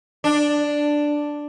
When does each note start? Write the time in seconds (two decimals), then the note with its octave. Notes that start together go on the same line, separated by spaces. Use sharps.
0.24 D4